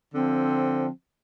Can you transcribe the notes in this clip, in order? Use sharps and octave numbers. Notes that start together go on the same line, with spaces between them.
D3 F3 C4